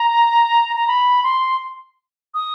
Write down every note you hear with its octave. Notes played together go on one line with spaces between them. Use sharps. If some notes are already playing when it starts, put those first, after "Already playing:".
Already playing: A#5
A#5
B5
C6
D#6